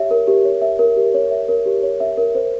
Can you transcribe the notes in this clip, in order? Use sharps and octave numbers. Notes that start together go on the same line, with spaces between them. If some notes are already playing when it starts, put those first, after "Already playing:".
Already playing: G4 C#5 E5
A#4
G4
C#5
E5
A#4
G4
C#5
E5
A#4
G4
C#5
E5
A#4
C5